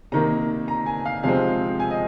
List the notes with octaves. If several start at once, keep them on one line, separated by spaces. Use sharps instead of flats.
C3 D#3 A#3 A#5
A#5
G#5
F5
C3 F3 G#3 C4 F5
G#5
D#5